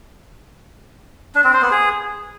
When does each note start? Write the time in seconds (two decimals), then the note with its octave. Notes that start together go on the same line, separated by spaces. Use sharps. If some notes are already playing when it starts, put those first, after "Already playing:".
1.35 D4
1.44 C4
1.53 C5
1.62 B3
1.71 G#4